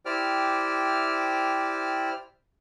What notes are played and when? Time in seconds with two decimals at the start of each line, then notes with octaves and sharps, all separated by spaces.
0.05 E4 G4 C5 D5 G5 F6